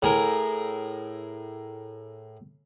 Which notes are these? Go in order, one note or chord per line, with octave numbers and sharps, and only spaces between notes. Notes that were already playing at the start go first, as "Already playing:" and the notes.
A2 G#4 A#4